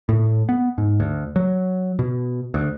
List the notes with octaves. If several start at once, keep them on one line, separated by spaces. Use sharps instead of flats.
A2
B3
G#2
D2
F#3
B2
D2